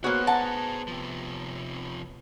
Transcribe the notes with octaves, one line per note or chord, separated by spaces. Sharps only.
A#3 B3 F#4 G#4 C5 C#5
F#5 A5 A#5
C3 F3